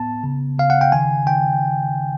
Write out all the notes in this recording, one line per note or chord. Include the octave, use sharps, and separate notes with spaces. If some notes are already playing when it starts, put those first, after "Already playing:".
Already playing: A2 B3 A5
C#3
C#3 F5
F#5
G5
D#3 G#5
D#3 G5